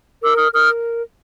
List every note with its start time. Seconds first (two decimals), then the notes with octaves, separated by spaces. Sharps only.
0.21 A#4 D6 E6
0.36 D#6 F6
0.52 A#4 D#6 F6